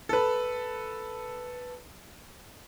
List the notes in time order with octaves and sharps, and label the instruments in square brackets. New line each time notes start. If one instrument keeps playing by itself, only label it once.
[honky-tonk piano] A4 B4